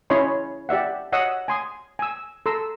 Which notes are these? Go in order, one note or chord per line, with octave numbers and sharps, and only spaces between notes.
C#4 E4 C#5 D#5 B5 C6
G4 D5 E5 F#5
C#5 D#5 F#5 D#6 E6
G#5 C6 D#6
G#5 E6
A4 A#5 C6 E6